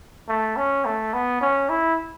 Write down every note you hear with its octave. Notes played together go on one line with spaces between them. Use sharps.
A3
C#4
A3
B3
C#4
E4